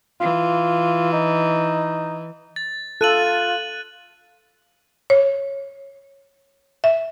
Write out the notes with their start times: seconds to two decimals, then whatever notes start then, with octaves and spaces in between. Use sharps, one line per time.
0.20 E3 F4
1.13 D#4
2.56 A6
3.01 F4 A4 F#6 D#7 F#7
5.10 C#5
6.84 E5